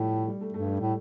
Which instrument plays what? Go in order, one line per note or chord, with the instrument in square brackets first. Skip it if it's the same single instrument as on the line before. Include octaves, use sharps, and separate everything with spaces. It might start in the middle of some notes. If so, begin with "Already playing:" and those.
Already playing: [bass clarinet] A2 [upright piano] F3 G3 A3
[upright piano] G3
A3
[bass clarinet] G2 [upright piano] A3
[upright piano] G3
[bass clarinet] A2